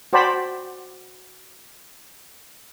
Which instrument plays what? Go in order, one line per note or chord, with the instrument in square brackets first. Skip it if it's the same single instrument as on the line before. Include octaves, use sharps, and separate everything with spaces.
[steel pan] F#4 C5 D5 G5 A5 B5